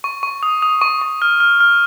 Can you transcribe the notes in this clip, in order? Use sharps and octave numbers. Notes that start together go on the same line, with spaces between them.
C#6
C#6
D#6
D#6
C#6
C#6
F6
F6
F6